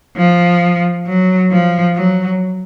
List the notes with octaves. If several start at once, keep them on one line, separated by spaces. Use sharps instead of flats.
F3
F#3
F3
F#3